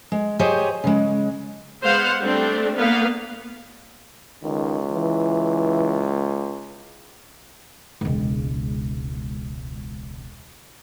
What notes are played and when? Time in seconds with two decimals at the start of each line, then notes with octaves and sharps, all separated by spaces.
0.12 G#3
0.39 G4 G#4 C5 C#5 D#5
0.84 C#3 G#3
1.84 G#3 B3 C5 F5 F#5
2.20 G3 A3 C4 D4
2.77 A#3 B3 F5
4.43 C#2 D#3
4.92 E3
8.01 E1 C#2